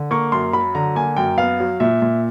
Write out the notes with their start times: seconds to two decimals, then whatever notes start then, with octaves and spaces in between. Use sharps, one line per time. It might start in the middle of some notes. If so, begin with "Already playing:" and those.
Already playing: D3
0.11 A#3 C#6
0.32 F#2 C6
0.53 F#3 B5
0.75 D3 A#5
0.95 A#3 G#5
1.17 F#2 G5
1.38 B3 F5
1.60 F#3
1.80 A#2 E5
2.02 A#2